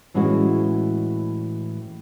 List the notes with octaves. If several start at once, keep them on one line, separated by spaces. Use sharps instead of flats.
A2 E3 G#3 C#4 F#4